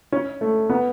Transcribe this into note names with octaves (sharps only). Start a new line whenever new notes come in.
C#4
A3
B3